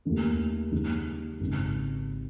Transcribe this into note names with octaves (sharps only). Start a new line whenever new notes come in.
D#2 D#3 A3
D#2 D#3 G#3
G#1 C#3